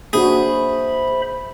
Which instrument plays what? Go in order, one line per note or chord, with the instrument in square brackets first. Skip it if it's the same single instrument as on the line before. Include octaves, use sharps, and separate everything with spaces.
[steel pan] A#3 D4 F#4 [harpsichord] G#4 [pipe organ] C5 E5 B5